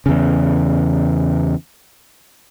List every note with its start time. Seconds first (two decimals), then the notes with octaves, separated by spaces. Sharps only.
0.06 E2 C#3